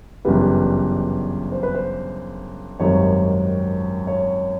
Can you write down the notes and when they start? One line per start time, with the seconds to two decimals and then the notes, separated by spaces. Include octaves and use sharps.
0.25 G1 F#2 C#3 E3 G3 B4
1.52 C5
1.63 B4
1.75 C5
2.80 G#1 F#2 D#3 G3 C#5
4.07 C#5